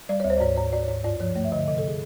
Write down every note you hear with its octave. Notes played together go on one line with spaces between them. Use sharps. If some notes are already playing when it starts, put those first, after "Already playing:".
G3 D5
C#5
D2
C5
D5
G#2 C#5
G#2 C#5
G#2 D5
C#5
G#2
G2 D5
F3 C#5
A3 C#5
E5
D3 D#5
C3 D#5
A4
G#4